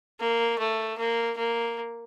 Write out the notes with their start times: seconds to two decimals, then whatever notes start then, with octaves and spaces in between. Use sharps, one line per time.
0.20 A#3
0.58 A3
0.98 A#3
1.37 A#3